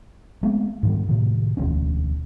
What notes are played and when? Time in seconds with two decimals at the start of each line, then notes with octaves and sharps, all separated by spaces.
0.43 G#3 A3 B3 C4
0.83 G#2 D#3 G3
1.09 A2 C3 D#3
1.57 E1 D2 C#4